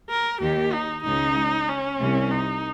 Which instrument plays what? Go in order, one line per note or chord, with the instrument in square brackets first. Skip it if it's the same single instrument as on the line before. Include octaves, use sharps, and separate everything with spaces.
[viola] A#4
[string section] D#2 D#3 [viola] G4
[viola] D#4
[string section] C#2 C#3 [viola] D#4
[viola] C#4
[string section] C2 C3
[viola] D#4